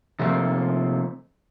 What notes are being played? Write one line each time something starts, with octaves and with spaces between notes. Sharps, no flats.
C3 F3 A3 A#3 C4